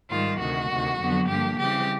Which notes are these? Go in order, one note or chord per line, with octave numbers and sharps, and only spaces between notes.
G#2 D#3 G3 F4
D2 C3 D#3 F#4
D2 C3 D#3
F2 D3 F#3 B3
G2 D3 F3 A#3 G4
C#3 E3 G3 C4 G4